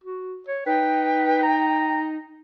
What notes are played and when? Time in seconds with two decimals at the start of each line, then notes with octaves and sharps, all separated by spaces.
0.04 F#4
0.48 C#5
0.66 D#4 B4 G5
1.43 A#5